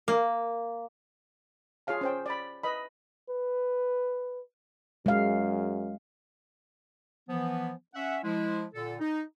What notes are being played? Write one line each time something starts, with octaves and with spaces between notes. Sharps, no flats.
A#3
F4 G#4 C#5 F5 A5
C#4 C5 G5
D5 B5
B4 D#5 B5
B4
F#2 G#3 F5
E3 F3 B3
C#4 E5 F#5
F3 G#3 E4
A#2 D3 A4
D#4